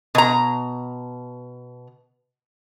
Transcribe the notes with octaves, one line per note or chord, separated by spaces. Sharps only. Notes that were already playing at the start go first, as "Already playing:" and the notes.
B2 A#5